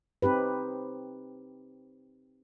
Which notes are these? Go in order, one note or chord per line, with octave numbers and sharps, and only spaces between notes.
C4 D#4 G4 B4